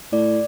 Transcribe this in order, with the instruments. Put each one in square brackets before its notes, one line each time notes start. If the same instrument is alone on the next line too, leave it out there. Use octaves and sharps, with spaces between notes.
[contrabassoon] A2 [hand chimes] D5